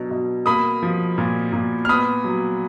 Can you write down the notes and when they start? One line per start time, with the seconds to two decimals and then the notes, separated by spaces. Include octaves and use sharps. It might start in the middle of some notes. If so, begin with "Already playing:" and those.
Already playing: B2 F#3 D4
0.11 B2
0.46 A#3 B5 D#6
0.83 F3
1.18 A#2
1.53 A#2
1.85 F6
1.89 B3 B5 D#6
2.24 F#3